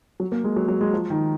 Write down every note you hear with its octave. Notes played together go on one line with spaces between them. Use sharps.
F#3
A#3
G#3
F#3
F#3
G#3
F3
D#3